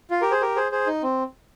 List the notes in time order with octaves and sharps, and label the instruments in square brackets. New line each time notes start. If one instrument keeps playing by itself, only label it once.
[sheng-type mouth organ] F4
G4 A#4
G#4 C5
G4 A#4
G#4 C5
G#4 C5
D#4
C4